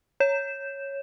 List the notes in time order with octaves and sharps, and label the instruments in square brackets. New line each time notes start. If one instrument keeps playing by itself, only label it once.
[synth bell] C#5 G6 E7